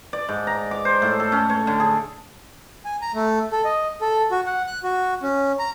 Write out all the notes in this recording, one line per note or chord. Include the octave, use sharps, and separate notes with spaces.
D5
G#2
A#5
D6
C5
A2
A4
C#4
C#5
D3
G#4
G#5
A#5
A3
A4
D#5
A4
F#4
F#5
F#6
F#4
C#4
A#5